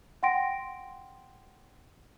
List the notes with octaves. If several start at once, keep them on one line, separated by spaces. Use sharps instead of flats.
F#5 G5 C6 A#6 D7